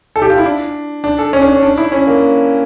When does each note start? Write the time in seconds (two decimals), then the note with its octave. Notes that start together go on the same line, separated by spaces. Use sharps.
0.16 A4
0.22 G4
0.30 F4
0.38 E4
0.45 D4
1.04 D4
1.19 A4
1.33 C#4
1.42 D4
1.48 C#4
1.63 D4
1.78 E4
1.92 C#4
2.07 A#3